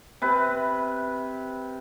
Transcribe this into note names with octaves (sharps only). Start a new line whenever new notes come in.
C3 B4